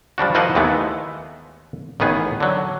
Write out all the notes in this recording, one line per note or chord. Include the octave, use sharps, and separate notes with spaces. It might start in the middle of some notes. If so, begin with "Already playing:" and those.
F3 G3 D4 F#4
E3 F3 A#4 C5 D#5 F#5
D#2 E3 G#3 A3 B3
A1 D#3 B3 G#4
D3 F#3